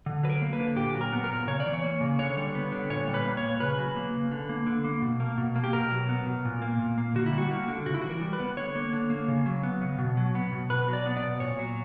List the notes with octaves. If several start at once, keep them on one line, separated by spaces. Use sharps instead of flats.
D3
F#3 B4
A#4
A#3
B4
D3
A#2 G4
F#3
A#4
B3
A#4
A#2
C#3 C#5
D5
E3
C#5
A#3
C#3
D3 C#5
G3
B3
D3
A#2 C#5
G3
B4
A#3
C#5
A#2
C#3 B4
F#3
A#3
C#3
D3
A#3
D3
A#3
B2
A#3
B2
A#3
G4
B2 A#4
F#3
B3
B2
A#2
A#3
A#2
A#3
D3 F#4
E4
G3
F#4
A#3
D3
C#3 F#4
E4
F#4
E3
A#4
G3
B4
B3
D3 C#5
A#3
D3
A#3
C#3
F#3
B3
C#3
B2
F#3
B3
B2
B2 B4
F#3
D5
B3
D5
B2
A#2 C#5
F#3